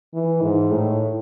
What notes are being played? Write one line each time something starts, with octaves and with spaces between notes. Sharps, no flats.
E3
G#2
A2